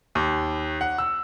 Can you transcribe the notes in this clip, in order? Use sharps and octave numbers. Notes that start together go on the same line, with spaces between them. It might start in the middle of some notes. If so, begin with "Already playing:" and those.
D#2
F#5
E6